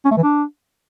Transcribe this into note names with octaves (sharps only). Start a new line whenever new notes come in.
C#4
A3
E3
D4